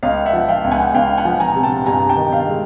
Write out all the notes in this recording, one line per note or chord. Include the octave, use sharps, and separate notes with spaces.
C#2 D#5 F5
E5 F#5
F3
F5 G5
C#2
F#5 G#5
C#2 F5 G5
F#5 G#5
F3
G#5 A#5
C3
G5 A5
G2 G#5 A#5
A#5
G5 A5
D#3
F5 G5
G#3